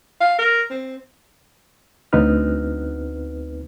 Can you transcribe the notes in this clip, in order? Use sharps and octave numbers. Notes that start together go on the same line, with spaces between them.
F5
A#4
C4
D2 B3 C4 D#4 B4 F6